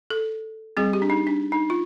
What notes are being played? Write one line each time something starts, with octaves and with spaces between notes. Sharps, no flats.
A4
G3 C4 G#4
G4
D4
D#4
D4
D#4
F4